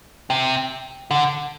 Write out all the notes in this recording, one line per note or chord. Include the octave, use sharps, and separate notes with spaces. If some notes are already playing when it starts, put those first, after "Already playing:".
C3
D3